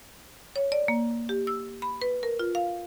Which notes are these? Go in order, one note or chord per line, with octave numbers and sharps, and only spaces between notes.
C#5
D5
A#3
G4
E6
B5
B4
A#4
F4
F5